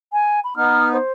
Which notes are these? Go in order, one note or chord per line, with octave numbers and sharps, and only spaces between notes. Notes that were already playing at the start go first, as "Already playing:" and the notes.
G#5
B5
B3 D#4 F6
C5